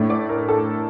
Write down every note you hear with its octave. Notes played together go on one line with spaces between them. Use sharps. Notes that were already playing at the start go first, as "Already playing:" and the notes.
Already playing: A2 A3 D4
D5
A#4
A4